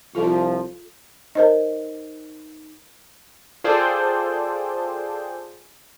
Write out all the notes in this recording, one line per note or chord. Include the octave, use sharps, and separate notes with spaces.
C2 F3 F4 A4
D#4 A#4 C5 D#5
F4 G#4 A4 C5 D5 G5